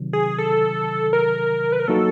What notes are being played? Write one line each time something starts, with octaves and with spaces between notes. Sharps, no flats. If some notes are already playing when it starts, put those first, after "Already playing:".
Already playing: C3 D#3 F#3
G#4
A4
A#4
B4
A#4
F#3 A#3 D#4 F#4 A4